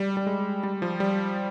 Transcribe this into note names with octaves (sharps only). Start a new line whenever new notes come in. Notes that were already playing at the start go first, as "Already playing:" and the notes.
Already playing: G3
G3
G#3
G3
F3
G3